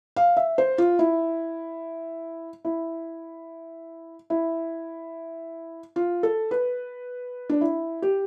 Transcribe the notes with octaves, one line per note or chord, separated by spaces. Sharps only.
F5
E5
C5
F4
E4
E4
E4
F4
A4
B4
D4
E4
G4